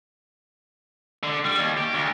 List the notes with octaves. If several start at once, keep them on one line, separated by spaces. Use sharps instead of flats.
D3
G3
D#2
G4
D2